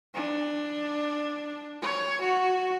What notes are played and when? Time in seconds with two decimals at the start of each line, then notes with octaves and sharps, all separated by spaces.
0.14 D4
1.82 C#5
2.21 F#4